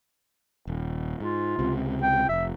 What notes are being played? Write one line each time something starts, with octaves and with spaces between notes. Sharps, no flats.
D#1
G#2 F4
C#2 C3
G5
F1 E5